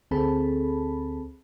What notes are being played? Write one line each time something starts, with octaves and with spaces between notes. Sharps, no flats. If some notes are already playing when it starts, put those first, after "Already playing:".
D2 C4 G#4 A4 A5 B5